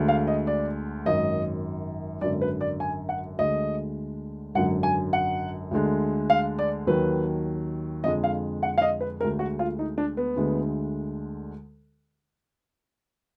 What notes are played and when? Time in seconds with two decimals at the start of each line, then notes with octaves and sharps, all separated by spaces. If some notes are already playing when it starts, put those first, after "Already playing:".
Already playing: D2 D3 G#3
0.08 F5
0.27 D#5
0.47 D5
1.05 G#1 F#2 D#3 D#5
2.21 G#1 F#2 D3 D5
2.41 B4
2.61 D5
2.80 G#5
3.09 F#5
3.39 D2 D3 G#3 D#5
4.55 G#1 F#2 D3 F#3 F#5
4.83 G#5
5.13 F#5
5.71 D2 D3 G#3
6.30 F5
6.59 D5
6.87 D#2 D#3 F#3 B4
8.04 F2 D3 G#3 D#5
8.24 F5
8.63 F#5
8.78 F5
8.82 D#5
9.01 B4
9.20 D2 D3 G#3 A#4
9.39 F#4
9.59 F4
9.79 D#4
9.98 D4
10.17 B3
10.36 D2 D3 G#3